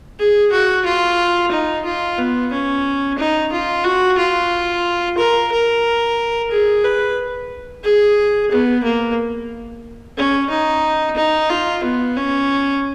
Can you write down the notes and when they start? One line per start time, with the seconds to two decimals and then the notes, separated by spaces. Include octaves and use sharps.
0.19 G#4
0.52 F#4
0.85 F4
1.51 D#4
1.85 F4
2.18 B3
2.52 C#4
3.18 D#4
3.52 F4
3.84 F#4
4.18 F4
5.17 A#4
5.52 A#4
6.51 G#4
6.84 B4
7.84 G#4
8.51 B3
8.83 A#3
10.17 C#4
10.50 D#4
11.17 D#4
11.50 F4
11.84 B3
12.17 C#4